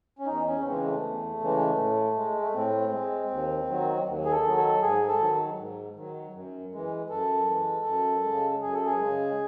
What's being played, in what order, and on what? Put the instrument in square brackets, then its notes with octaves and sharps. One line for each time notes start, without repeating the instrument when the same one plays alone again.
[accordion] C#4
E2 D#4
C#4
C#3 E3 G#3 C4
A3
E2
C#3 E3 G#3
A2
G#3
A3
A2 C4
G#3
D#2
D#3 F#3
D#2
G#4
A4
D#3 F#3
A4
G#2 G#4
A4
D#3 F#3
G#2
D#3 F#3
F#2
E3 G#3
F#2 A4
E3 G#3
F#2
C#3 G#3
F#2 G#4
A4
G#4
C#3 G#3